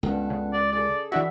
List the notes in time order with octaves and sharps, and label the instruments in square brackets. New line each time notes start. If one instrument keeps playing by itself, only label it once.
[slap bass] C#2 [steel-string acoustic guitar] G2 B3 A4
[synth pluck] C#3
[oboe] D5
[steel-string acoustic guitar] G#4 A4 [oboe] D5
[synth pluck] E3 D4 F#4 [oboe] E5